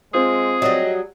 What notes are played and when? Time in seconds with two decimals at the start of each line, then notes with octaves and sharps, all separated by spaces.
0.14 G#3 C4 F4 G#4 C5
0.62 F#3 G3 D#5